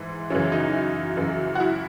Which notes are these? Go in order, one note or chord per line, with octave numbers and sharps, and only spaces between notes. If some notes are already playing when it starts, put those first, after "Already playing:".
Already playing: G#2 E3
F#2 C#3 E3 C#4
D#4
F#2 C#3 E3
F#4
E4